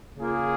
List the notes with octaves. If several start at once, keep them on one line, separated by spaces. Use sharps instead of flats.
C#3 A#3 F4 G#4